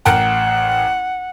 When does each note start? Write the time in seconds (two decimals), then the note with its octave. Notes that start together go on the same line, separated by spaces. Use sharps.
0.06 A1 A#4 F#5 G5